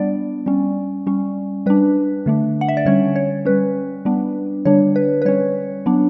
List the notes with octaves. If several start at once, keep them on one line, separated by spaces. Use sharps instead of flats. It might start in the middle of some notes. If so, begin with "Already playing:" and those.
Already playing: G3 B3 D4 D5
G3 C#4
G3 C#4
G3 D4 B4
D3 A3 D4
F#5
E5
D5
D3 G3 C#4 C#5
C#5
G3 C#4 B4
G3 B3 D4
D3 G3 D4 C#5
B4
B4
G3 C#4 C#5
F#3 B3 D4